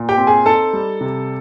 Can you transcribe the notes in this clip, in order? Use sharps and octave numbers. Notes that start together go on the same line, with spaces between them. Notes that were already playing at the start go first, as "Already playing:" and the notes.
Already playing: A#2
G4 G5
C4
G#4 G#5
D#4 A4 A5
G3
C3